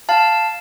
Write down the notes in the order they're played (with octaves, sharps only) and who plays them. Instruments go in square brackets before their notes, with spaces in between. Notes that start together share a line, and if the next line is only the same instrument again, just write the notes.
[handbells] F5 A5